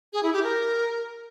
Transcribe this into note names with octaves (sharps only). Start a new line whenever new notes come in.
G#4
E4
G4
A#4